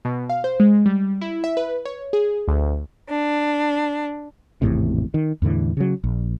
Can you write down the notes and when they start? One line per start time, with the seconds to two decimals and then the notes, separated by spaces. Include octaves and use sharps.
0.05 B2
0.29 F5
0.44 C5
0.60 G#3
0.86 G3
1.21 E4
1.44 E5
1.57 B4
1.85 C#5
2.13 G#4
2.48 D2
3.10 D4
4.62 G#1 E2 A2 C3
5.14 D#3
5.42 E2 A2 D3 E3
5.77 C#3 F#3
6.04 A#1